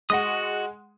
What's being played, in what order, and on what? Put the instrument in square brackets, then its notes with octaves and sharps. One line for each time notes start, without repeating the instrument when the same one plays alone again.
[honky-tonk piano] G#3 F#5 [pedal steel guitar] F#4 D#5 D#6